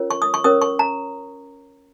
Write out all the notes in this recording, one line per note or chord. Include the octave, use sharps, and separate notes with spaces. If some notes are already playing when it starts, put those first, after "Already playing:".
Already playing: C#4 F4 A#4 C#5
C#6
D#6
C#6
C#4 A#4 C#5 D#6
C#6
A#5